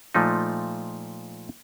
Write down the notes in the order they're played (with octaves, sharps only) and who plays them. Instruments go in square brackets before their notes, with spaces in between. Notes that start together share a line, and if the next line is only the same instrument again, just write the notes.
[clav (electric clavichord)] A#2 F3 A3 D#4